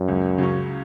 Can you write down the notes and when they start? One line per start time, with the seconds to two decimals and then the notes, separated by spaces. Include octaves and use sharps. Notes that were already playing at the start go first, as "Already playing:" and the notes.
Already playing: F#2
0.08 C#2
0.38 C#3 F#3 C#4